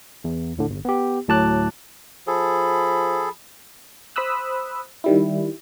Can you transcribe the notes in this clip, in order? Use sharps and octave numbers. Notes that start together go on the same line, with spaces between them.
E2
D#2 A2 D3
G1
B3 G4
D2 A2 F#3 A5 D6 F#6
F3 G#4 A4 B5
C5 B5 D#6 E6 F#6
D#3 G3 E4